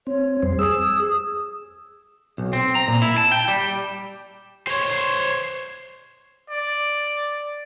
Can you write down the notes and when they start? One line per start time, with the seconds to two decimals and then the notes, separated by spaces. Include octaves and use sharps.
0.07 C4 C#5
0.43 F2 G3 C5
0.59 G#4 D#6 E6
2.38 B1
2.53 C4
2.75 A#5
2.88 A#2
3.02 E4
3.18 A5
3.32 G5
3.48 G3
4.67 C5 C#5
6.50 D5